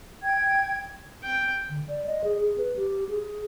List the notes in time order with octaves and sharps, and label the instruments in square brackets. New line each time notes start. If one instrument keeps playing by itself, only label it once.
[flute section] G5 G#6
[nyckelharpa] G5
[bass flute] D3
D5
D#5
G#4
G#4
B4
G4
G#4